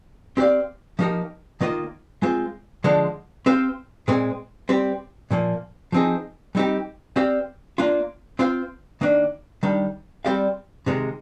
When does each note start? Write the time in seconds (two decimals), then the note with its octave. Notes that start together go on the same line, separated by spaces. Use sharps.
0.37 C4 G4 D5 F5
0.99 F3 A#3 D#4 G4 A#4
1.61 D#3 A#3 F4 A#4 D#5
2.22 G#3 C4 F4 C5
2.84 D3 F3 G#3 D4
3.46 C4 G4 C5 F5
4.08 A#2 G#3 C4
4.69 G3 C4 G4
5.31 A#2 F3 A#3
5.92 F3 C4 D#4 G#4
6.55 G3 C4 D#4 G4
7.16 C4 G4 D5 F5
7.78 A#3 D4 F4
8.39 C4 F4 C5 F5
9.01 D#3 A#3 D4
9.63 D#3 G3 D4
10.25 G3 C4 G4 D5 F5
10.86 C3 D#3 G#3